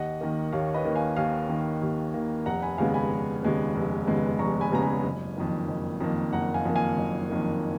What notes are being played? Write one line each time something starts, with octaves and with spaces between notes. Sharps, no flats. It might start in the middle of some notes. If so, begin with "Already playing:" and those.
Already playing: D#2 D#5 F#5
D#3 A#3
D#2 C#5 F5
B4 D#5
D#3 A#3
F5 G#5
D#2 F5 G#5
D#3 A#3
D#2
D#3 A#3
F1 F#5 A#5
G#5 B5
D#2 C#3 G#3 B3 F5 G#5
G#5 B5
F1
D#2 C#3 G#3 B3
F1
D#2 C#3 G#3 B3
F1 A#5 C#6
G#5 B5
D#2 C#3 G#3 B3 A#5
G#5 B5
F#1
F2 D#3 A#3
F#1
F2 D#3 A#3
F#1 F#5 A#5
F5 G#5
F2 D#3 A#3
F5 G#5
F#1
F2 D#3 A#3